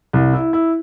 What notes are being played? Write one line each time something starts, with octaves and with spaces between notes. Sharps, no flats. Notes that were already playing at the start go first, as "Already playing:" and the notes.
C2
E4
E4